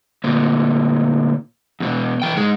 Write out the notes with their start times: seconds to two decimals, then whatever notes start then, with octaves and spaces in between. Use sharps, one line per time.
0.24 D2 A#2
1.80 E2 B2
2.22 E3 G5
2.37 G#2 G#3